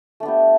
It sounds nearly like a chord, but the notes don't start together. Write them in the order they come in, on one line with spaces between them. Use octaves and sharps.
A3 D4 B3 G4